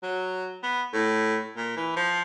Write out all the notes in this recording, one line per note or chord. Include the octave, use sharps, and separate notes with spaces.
F#3
B3
A2
A#2
E3
F3